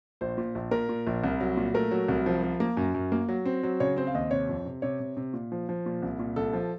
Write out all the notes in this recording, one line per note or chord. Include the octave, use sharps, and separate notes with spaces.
A#1 C5
A#2
A#1
A#2 A#4
A#2
A#1
C2
F#3
A#2
A3 A#4
F#3
C2
F3
F3
A#3
F#2
F#2
A#3
F#3
C4
F#3
C#3 C#5
C4 C5
F5
D#2 D#5
C3 C#5
F2
C3
C3 C#5
C3
C3
A#2
F3
F3
A#2
C2
A#2
C2 A4
F3